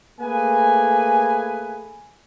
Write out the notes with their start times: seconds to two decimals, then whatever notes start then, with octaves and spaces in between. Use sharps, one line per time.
0.21 A3 A#3 G#4 B4 G#5